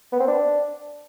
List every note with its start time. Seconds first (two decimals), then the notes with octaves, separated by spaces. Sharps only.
0.13 B3
0.20 C4
0.28 D4